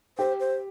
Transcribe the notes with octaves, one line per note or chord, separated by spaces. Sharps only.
G4 C5
C5